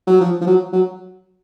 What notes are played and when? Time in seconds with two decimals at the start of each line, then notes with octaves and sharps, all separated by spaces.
0.07 F#3
0.21 F3
0.41 F3
0.47 F#3
0.73 F#3